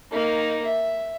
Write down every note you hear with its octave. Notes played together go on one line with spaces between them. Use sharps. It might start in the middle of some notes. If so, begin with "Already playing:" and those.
A#3 D#4
E5